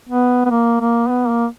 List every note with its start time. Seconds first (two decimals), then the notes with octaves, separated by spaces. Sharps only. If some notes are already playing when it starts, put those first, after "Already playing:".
0.09 B3
0.46 B3
0.50 A#3
0.80 A#3
1.09 B3
1.28 A#3